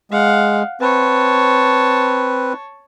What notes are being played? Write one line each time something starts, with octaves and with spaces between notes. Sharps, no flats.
G#3 F5 F#5
C4 B4 C#5 A5